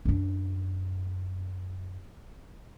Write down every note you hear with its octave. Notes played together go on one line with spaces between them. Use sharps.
F#2 D4